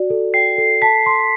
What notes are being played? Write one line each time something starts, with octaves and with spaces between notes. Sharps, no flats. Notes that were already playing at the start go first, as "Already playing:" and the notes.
Already playing: F#4 D5
A4
G5 C7
A4
A5 B6
C6